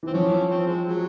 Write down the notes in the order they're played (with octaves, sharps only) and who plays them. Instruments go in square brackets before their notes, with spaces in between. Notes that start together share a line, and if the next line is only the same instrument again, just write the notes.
[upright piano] E3 [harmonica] C4
[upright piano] F3 [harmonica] C#4
[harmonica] C#4
C4
G#3
F#3